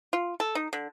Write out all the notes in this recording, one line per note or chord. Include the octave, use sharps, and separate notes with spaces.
F4
A4
D#4
D3